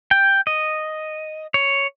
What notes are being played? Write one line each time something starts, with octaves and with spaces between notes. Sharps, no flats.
G5
D#5
C#5